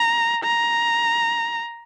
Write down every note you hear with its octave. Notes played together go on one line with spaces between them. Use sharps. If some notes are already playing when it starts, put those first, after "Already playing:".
Already playing: A#5
A#5